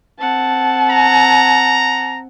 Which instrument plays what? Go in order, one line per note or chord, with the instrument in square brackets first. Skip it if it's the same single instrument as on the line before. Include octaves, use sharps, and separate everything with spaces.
[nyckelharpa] C4 F#5 [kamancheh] A5
[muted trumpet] A#5